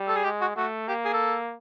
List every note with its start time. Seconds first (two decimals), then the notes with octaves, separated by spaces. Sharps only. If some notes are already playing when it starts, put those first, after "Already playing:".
Already playing: G3
0.08 A4
0.16 G#4
0.24 G#3 G4
0.41 F#4
0.56 A3 F#4
0.88 A#3 G4
1.05 G#4
1.14 A4